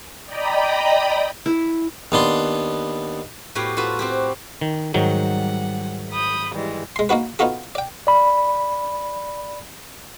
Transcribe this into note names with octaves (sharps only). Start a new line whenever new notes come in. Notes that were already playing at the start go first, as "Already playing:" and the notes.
D5 D#5 G5 A#5 B5 D#6
E4
D#2 B3 D4 C6
A2 B3 F#4 G4 F5 G5
F4 F#4 A4 B4
C4 F#4 G4
D#3
G#2 D#3 F#3 G3 F#5
B5 D#6 G6
E3 G3 G#3
G#3 C6
A#3 D#4 F#4 B4
B3 D#4 F4 F#4 A4
D5 G5
D5 B5